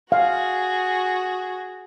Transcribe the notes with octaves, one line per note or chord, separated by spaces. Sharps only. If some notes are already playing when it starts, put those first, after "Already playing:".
F#4 G#4 F5